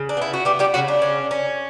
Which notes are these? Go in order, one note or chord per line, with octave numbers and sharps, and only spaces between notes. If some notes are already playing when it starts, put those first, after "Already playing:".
Already playing: C#3
D4
B3 E4
F#4
G3 B3 G4
G3 G4
C#3 F#3 F#4
D4
C#4
C#4